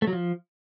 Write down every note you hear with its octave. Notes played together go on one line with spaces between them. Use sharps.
A3
F#3
F3